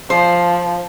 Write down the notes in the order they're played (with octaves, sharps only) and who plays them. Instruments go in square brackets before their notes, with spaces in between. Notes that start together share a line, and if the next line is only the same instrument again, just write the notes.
[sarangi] F3 [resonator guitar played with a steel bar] C5